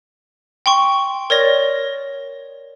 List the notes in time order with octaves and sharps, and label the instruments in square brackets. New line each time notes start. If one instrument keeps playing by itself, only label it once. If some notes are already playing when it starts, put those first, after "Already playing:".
[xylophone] G5 C6 C#6
A#4 C#5 D5 A#6